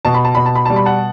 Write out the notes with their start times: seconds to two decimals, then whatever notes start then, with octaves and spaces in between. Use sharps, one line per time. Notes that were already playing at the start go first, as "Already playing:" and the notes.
0.05 B2 A5
0.14 B5
0.25 A5
0.35 B2 B5
0.46 A5
0.55 B5
0.66 G3 A5
0.76 B5
0.85 F#5 A5